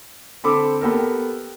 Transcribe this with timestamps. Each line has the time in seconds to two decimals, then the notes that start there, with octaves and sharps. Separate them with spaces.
0.44 D3 C4 A4 B5 D6
0.81 B3 G4 A4 A#4